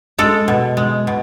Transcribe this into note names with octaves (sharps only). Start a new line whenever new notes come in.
G#3 A4
B2
G#3
B2